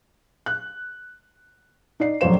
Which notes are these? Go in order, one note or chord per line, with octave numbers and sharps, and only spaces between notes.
F#6
D#4 D5 C7
F1 A#1 F#2 F#3 C5 E7